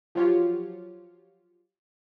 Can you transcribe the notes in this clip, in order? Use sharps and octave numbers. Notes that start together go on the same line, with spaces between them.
F3 F#3 F4 G4 C#5